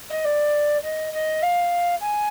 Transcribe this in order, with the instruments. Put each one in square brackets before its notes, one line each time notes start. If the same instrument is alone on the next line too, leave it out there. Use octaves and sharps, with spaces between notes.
[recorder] D#5
D5
D#5
D#5
F5
G#5